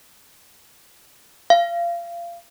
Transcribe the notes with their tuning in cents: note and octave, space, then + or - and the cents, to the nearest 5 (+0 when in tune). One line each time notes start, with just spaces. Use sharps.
F5 -30